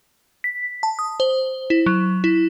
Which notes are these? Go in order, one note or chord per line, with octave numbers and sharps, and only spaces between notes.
B6
A5
D#6
C5
E4
F#3
E4